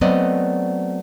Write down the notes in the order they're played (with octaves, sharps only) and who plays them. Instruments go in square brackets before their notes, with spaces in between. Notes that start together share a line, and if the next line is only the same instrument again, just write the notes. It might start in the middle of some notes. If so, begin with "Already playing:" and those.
[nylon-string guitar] F#3 A3 B3 C4 D5 D#5